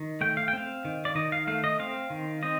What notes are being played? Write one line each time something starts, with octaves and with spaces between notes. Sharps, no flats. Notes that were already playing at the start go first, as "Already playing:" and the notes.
Already playing: D#3
A3 G5
F5
G5
C4 F5
D#3
D5
D#3 D#5
F5
A3 F5
D#5
C4 F5
D#3
C4 D#5